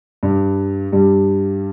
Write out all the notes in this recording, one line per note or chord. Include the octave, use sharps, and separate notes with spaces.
G2 G3
G2 G3